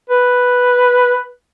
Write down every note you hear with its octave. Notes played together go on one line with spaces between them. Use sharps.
B4